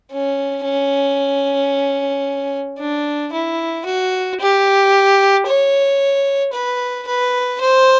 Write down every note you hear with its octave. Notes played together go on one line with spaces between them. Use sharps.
C#4
C#4
D4
E4
F#4
G4
C#5
B4
B4
C5